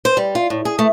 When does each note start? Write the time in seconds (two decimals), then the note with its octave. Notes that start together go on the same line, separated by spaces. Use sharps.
0.05 C5
0.17 G3
0.35 F4
0.50 A2
0.65 G#4
0.79 A3